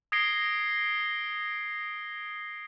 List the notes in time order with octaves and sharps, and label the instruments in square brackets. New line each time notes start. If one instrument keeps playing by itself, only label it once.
[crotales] D#6 G#6 A#6 C7 D7 G7